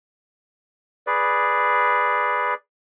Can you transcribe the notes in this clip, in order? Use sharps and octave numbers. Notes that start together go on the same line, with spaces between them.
G#4 B4 D5